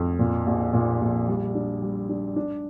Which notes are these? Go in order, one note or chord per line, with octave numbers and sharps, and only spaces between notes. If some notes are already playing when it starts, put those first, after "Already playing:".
Already playing: F2
A#2
A#1
A#2
A#1
G3
D4
G3
D4
D4